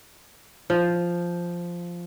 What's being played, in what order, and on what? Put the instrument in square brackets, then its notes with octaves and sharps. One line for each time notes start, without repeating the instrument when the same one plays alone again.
[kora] F3